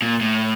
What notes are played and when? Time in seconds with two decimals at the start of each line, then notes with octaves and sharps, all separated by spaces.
0.02 A#2
0.21 A2